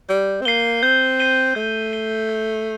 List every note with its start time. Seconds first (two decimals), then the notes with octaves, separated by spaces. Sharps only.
0.09 G3 G6
0.41 C4
0.45 A#3 C7 D#7 G7
0.83 C4 G6
1.20 C7 D#7 G7
1.55 A3 G6
1.93 C7 D#7 G7
2.29 G6